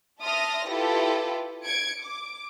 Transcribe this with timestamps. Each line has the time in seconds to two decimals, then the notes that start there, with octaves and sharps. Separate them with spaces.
0.22 E5 A5 C6 D#6 F6 A#6
0.70 E4 F4 G4 A4 B4
1.65 G#6 C#7 D7
2.03 D6